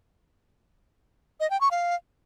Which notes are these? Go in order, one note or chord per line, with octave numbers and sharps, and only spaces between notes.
D#5
G5
C#6
F5